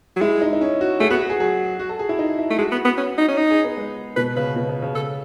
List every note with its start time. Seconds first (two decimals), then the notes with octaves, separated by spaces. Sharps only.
0.16 F#3
0.21 G#3 E4
0.42 D#4
0.53 D#4
0.61 C#4
0.81 F#4
1.00 A3 G#4
1.10 B3 F#4
1.20 F#4
1.30 G#4
1.40 F#3 G#4
1.80 F#4
1.89 A4
1.99 G#4
2.09 E4
2.19 D#4
2.39 E4
2.50 A3
2.58 G#3 F#4
2.72 B3
2.85 B3
2.97 C#4
3.18 D#4
3.29 C#4
3.38 D#4
3.50 G#4
3.64 B3
3.77 G#3
4.16 B2 B4
4.36 C#3 B4
4.56 B2
4.69 C#3
4.82 C#3
4.95 A4